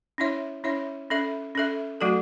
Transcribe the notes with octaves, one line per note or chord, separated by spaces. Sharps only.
C#4 E4 C#5 E5
C#4 E4 C#5 E5
C#4 A4 E5
C#4 A4 E5
F#3 A3 F#4 A4